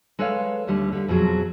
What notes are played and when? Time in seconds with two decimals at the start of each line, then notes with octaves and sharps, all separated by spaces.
0.19 G#3 A4 B4 C#5 F5
0.67 D#2 D3 G3 A3
0.92 D3 G3
1.08 F2 B2 F3 F#3 G#4